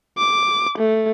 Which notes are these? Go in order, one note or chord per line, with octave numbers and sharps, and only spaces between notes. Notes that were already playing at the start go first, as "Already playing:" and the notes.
D6
A3